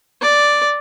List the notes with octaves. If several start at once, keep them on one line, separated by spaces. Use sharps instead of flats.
D5